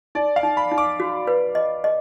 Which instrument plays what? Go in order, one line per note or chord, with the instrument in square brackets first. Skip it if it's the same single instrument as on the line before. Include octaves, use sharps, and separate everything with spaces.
[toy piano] D#4 [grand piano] D5
[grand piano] F5
[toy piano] D#4
[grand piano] B5
[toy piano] D#4
[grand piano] D6
[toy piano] F#4
B4
D#5
D#5